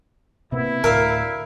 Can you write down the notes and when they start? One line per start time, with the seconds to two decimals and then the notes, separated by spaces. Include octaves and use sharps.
0.52 C3 A#3 B3 E4
0.84 D2 A2 D4 A#4 E5 F5